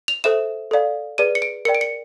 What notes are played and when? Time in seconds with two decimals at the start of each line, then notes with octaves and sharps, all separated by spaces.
0.08 F7
0.24 A4 C5 E5 E7
0.71 A4 D5 F5
1.18 G#4 B4 D5 D#7
1.35 C#7
1.42 D7
1.65 A#4 D5 G5 C#7
1.75 D7
1.81 C#7